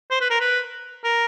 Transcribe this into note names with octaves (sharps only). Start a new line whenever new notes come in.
C5
B4
A#4
B4
A#4